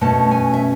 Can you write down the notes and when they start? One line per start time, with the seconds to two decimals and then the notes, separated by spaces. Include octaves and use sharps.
0.01 B2 A3 C#4 A5
0.31 G#5
0.54 E5